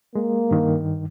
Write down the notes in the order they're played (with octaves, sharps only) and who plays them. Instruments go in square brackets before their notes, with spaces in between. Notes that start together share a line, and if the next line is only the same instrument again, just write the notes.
[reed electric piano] G#3 [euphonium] A#3
[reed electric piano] G2 D#3